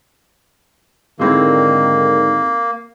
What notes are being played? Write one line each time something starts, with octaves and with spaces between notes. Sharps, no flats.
G#2 D3 D#3 G#3 A#3 C4 E4